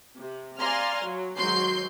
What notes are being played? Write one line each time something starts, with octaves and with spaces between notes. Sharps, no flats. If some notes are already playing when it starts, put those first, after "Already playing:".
C3
D5 F5 G#5 A#5 C6 F6
F#3
G#2 D#3 F#3 C6 G6 C7